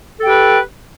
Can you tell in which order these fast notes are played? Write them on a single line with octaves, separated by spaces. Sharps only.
A4 G5 G4 B4